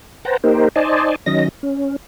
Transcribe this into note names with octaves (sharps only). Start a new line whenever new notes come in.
B4 C5 F#5 G5 A5 A#5
A#3 D#4 G4 A#4 C5
D#4 C5 D5 D#5 G#5 A5
D#3 F#3 C#4 D#5 A#6
C#4